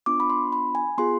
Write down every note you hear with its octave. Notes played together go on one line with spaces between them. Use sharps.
B3 D4 F4 D6
B5
C6
B5
G#5
B3 F4 G#4 C6